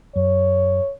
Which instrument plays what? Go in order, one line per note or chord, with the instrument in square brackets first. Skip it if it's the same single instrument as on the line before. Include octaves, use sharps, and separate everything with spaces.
[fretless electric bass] F#2 [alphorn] C#5